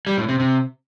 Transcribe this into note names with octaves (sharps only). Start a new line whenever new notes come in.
G3
A2
C3
C3